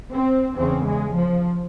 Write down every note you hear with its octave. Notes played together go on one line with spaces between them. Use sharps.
C4
E2 C#3 C4
G#3
F3